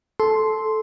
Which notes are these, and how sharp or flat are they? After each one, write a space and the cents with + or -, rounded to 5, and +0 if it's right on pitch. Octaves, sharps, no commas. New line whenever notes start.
A4 -15 C6 +0